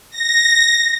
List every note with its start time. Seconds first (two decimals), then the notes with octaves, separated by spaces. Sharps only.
0.10 A#6